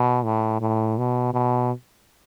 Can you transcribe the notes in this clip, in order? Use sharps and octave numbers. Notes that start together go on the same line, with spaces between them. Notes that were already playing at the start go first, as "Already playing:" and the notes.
Already playing: B2
A2
A2
B2
B2